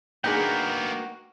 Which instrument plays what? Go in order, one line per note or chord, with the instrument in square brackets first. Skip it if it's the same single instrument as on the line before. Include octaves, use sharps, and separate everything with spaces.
[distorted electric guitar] A#3 B3 [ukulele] D4 D#4 G#4 [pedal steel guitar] F#4 A#4 G5